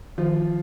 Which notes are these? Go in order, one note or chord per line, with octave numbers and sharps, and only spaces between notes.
D#3 F3 F4